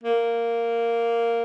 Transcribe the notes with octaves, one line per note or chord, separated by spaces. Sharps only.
A#3